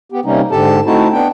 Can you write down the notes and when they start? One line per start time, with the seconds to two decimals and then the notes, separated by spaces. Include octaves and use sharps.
0.12 B3 G4
0.25 C3 G3 A#3 C#4 D#4
0.51 G#2 D3 G4 A4 A5
0.86 A3 C4 D#4 E4 F#4 A5
1.13 B3 D4 G5